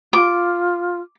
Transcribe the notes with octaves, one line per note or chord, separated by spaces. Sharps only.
F4 D6